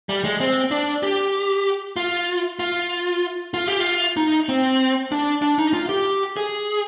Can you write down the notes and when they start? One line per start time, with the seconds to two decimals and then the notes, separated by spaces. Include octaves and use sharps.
0.09 G3
0.24 G#3
0.41 C4
0.71 D4
1.03 G4
1.96 F4
2.59 F4
3.54 F4
3.68 G4
3.80 F4
4.17 D#4
4.49 C4
5.12 D4
5.42 D4
5.59 D#4
5.73 F4
5.89 G4
6.37 G#4